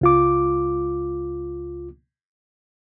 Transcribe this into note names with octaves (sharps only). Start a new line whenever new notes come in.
C#2 F4 D6